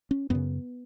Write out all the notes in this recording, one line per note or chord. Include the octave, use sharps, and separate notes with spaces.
C#4
F#2 C#3 B3